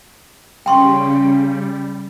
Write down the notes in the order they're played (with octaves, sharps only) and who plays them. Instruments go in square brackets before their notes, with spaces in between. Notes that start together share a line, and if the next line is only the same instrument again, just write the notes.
[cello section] C#3 [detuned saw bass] G3 [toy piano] G5 C6 C#6